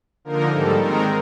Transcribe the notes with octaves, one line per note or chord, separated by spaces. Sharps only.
D3 F3 A#3 D#4 A#4
G#2 D#3 G3 A4
D#3 G#3 C4 D#4 A#4